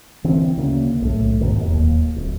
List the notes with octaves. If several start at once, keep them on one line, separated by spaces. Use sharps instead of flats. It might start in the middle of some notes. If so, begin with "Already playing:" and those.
D3 E3 C4
D2 C#3 A#3
B1 A2 A3
F2 G#2 B2 D#3
D1 D#2
D1